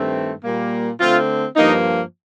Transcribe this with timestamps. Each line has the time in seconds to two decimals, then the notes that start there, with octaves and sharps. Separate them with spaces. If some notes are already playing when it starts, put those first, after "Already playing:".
Already playing: G2 D#3 A3 C4
0.44 A#2 G3 A#3
1.00 D3 A3 C4 F4
1.57 G2 F3 A#3 D#4